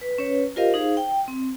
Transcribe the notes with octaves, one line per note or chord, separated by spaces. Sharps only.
B4
C#4 B4 C#5
F4 G4 A#4 C5 D#5 F5
D#4 G#4 C5 F5
G5
C4